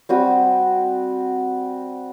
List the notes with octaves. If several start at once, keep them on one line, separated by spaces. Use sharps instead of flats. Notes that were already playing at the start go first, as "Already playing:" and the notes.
G3 C4 F#4 D#6